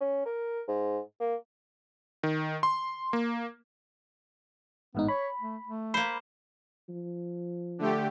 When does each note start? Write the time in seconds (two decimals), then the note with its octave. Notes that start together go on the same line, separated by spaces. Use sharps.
0.01 C#4
0.26 A#4
0.68 G#2
1.20 A#3
2.23 D#3
2.63 C6
3.13 A#3
4.95 A1 G#2 B3 D#4
5.08 C#5 B5
5.41 A3
5.67 A3
5.94 A#3 C5 B5
6.89 F3
7.79 D3 A3 G4